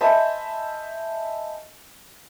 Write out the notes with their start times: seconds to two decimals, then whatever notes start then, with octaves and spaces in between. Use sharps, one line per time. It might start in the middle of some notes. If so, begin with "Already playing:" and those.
0.01 C5 D#5 E5 G#5 A5 B5